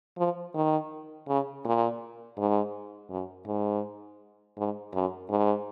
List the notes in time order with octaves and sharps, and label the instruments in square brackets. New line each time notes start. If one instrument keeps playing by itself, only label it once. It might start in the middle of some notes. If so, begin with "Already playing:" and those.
[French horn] F3
D#3
C#3
A#2
G#2
F#2
G#2
G#2
F#2
G#2